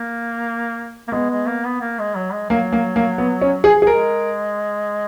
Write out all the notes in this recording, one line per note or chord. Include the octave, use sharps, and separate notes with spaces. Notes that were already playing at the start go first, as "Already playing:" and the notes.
Already playing: A#3
A#3
G#3 B3
G#3
A#3
B3
A#3
G#3
F#3
G#3
F#3 A#3
A#3
A#3
B3
C#4
G#4
G#4
G#3 A#4